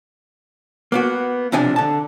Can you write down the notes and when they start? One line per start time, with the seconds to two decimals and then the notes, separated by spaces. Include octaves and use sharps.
0.92 A#3 B3 F#4
1.52 B1 C3 F3 D4 G#5
1.76 D3 A5